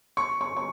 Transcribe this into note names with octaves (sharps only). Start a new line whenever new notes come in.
C#6
C#6
C#6